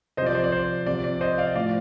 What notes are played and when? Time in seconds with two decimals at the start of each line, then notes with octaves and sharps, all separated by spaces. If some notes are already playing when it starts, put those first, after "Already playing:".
0.17 C3 C5 D#5
0.22 F3 D5
0.35 C5
0.44 D5
0.52 C5
0.86 C3 F3 D5
1.04 D5
1.21 C5 D#5
1.38 D5 F5
1.55 A2 F3 D5 F5